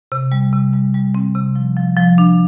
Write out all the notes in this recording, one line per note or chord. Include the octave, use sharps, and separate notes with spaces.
C3
G3
C3
G3
G3
C4
C3
F3
F3
F3
D4